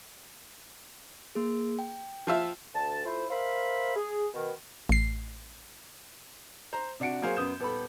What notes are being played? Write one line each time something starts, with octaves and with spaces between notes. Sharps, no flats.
A#3 G#4
G5
F3 F4 E5
D2 A5
A3 E4 F4 C5
A#4 C5 E5 F5 B5
G#4
B2 D#3
A1 C7
C5 A#5
C3 D4 F#4 C#7 D7
F#3 A#3 G#4 C5 F5
F#2 B3 D#6 G6 E7
D#1 B3 A4 B5